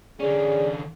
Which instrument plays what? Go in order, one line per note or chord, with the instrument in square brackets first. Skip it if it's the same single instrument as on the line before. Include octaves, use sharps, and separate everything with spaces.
[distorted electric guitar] D3 C#4 [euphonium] G#4 [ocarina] D5